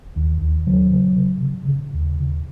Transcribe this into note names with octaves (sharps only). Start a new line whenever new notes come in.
D#2
D#2
C#3 F#3
C#3
C#3
C#3
C#3
D#2
C#3